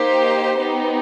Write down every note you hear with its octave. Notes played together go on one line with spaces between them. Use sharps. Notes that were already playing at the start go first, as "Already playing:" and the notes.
Already playing: A#3 D#4 G4 C5
B3 D#4 G4